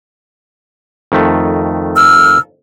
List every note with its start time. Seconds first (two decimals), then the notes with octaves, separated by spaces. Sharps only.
1.12 F2 D#3 A3
1.95 E6 F6